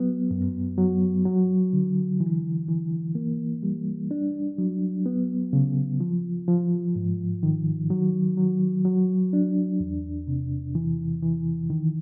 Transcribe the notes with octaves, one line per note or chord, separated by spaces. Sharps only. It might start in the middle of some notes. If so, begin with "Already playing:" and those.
Already playing: F#3 B3
F#2
F#3
F#3
D3
E3
E3
A#3
G3
D4
F#3
B3
C#3
F3
F3
G#2
D#3
F#3
F#3
F#3
D4
E2
C3
E3
E3
D#3